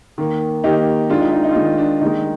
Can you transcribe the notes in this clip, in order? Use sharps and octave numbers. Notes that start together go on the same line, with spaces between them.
D#3 A#3
D#3 A#3 D#4 G4
D#3 G#3 D4 F4
D#4
D#4
D#4
F4
D#3 G#3 D#4
D4
D#3 G#3 D#4